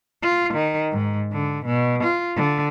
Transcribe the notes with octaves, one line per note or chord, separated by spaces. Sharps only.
F4
D#3
G#2
D3
B2
F4
D3